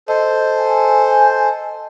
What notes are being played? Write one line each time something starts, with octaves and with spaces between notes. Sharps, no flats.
A4 C5 D#5
G#5